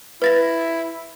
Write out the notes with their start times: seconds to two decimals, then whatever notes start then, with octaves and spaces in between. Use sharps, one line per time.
0.22 E4 B4 A6 A#6